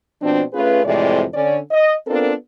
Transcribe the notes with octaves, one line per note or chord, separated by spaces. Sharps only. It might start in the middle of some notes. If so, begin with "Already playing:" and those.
B2 F3 C4 D4
A3 C#4 F4 G#4 B4
F2 A2 C3 E3 G#3 D5
D3 C#4 D5
D#5
B3 C4 D4 F4 A4 A#4